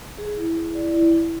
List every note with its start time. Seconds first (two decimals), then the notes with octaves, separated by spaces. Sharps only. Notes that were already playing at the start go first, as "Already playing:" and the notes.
0.18 G#4
0.37 E4
0.56 E4
0.75 D5
0.94 E4
1.12 E4